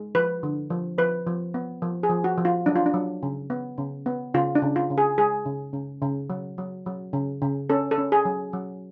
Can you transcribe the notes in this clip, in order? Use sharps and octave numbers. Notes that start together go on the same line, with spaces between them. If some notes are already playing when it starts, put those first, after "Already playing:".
Already playing: G#3
F3 B4
D3
F3
F3 B4
F3
B3
F3
G#4
F3
F#4
F3
F4
F#3 D4
F4
D4
F#3
C#3
B3
C#3
B3
C#3 F4
D4
C#3
F4
C#3
G#4
G#3 G#4
C#3
C#3
C#3
F#3
F#3
F#3
C#3
C#3
C#4 A4
A4
C#4
G#4
F#3
F#3